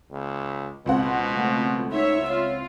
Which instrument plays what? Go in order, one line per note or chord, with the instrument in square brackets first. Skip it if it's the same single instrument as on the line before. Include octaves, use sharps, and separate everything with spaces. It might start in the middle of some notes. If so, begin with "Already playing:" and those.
[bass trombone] C#2
[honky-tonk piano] C#2 C4 F#5 [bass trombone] B2
[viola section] F3 A3 F#4
[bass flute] D#4 [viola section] C#5 E5
[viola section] F4 [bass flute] C#5